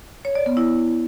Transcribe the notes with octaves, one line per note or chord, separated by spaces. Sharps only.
C#5
D5
B3
E4